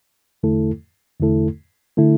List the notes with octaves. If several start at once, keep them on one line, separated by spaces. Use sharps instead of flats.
E2 D3 A3 E4 A4
E2 D3 A3 E4 A4
D3 A3 E4 A4